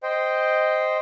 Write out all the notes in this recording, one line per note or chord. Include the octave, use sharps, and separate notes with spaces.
C5 D#5 G5